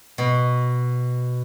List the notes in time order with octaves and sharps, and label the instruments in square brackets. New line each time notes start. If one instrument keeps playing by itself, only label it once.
[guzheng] B2